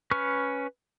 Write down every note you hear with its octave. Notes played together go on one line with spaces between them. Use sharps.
C#4 B4 C#6 F6